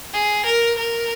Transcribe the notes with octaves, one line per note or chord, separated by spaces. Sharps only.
G#4
A#4
A#4